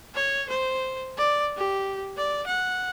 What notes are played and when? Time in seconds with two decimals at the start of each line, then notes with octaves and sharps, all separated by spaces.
0.15 C#5
0.49 C5
1.17 D5
1.57 G4
2.17 D5
2.47 F#5